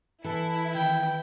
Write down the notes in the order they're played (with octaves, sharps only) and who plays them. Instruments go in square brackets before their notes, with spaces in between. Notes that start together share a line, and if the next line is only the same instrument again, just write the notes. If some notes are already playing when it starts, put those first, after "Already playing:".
[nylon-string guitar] E3 [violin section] E4 [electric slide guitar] A4 A5
[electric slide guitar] D#3 [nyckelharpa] G5